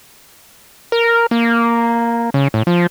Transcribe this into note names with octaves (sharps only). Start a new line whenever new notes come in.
A#4
A#3
C#3
A2
F3